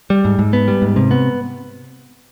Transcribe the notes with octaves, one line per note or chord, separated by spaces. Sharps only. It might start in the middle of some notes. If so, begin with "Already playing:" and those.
G3
G#2
G#2
B3
G3
G#2
C3
B3